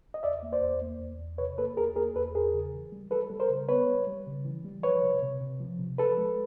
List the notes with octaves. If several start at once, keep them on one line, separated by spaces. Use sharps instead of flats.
D#5
E2 D5 E5
A#3
C5 D5
E2
A#3
E2
E2
C3 B4 C#5
A#3 A4 B4
E2 G#4 A#4
A#3 G#4 A#4
E2 A4 B4
E2 G#4 A#4
C#3
E3
G3
G3 A4 B4
G3
A#4 C5
C#3
B3 B4 C#5
G3
G3
C#3
E3
G3
F3 B4 C#5
C3
C3
C3
F3
C3
F3 A4 B4
G#3